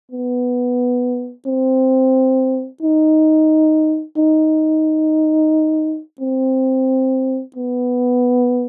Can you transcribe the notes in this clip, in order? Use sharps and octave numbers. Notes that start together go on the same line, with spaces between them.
B3
C4
D#4
D#4
C4
B3